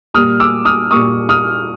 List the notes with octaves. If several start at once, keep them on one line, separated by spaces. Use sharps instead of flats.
A#2 G3 A#3 D#6 F6
D6 E6
D#6 F6
A#2 G3 A#3 C#6 D#6
D#6 F6